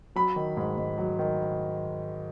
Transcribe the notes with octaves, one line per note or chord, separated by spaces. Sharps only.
F#3 B5
D#3
G#2
G#2
F#3
D#3